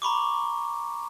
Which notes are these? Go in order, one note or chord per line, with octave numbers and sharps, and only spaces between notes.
A#5 B5 C#6 D6